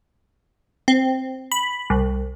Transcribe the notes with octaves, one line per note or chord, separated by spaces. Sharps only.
C4
B5
C2